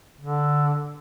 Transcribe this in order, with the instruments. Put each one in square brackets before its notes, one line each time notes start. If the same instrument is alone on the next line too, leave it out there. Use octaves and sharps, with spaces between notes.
[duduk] D3